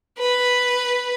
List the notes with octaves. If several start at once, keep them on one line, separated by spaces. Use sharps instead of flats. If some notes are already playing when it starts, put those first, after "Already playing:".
B4